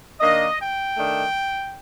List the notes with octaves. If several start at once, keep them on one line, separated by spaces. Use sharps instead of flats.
D#3 A#3 D4 D#5
G5
D#3 A3 D4